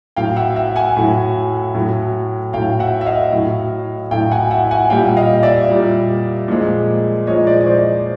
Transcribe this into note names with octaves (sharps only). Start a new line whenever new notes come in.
A2 F#3 F5 G5
E5 F#5
E5 F#5
F#5 G#5
A2 F#3
A2 F#3
A2 F#3 F5 G5
E5 F#5
E5
D#5 F5
A2 F#3
A2 F#3 F5 G5
F#5 G#5
E5 F#5
F#5 G#5
A#2 G3 F5 G5
D#5 F5
D5 E5
A#2 G3
A#2 F3 G#3
A#2 F3 G#3 C#5 D#5
C5 D5
D#5
C5 D5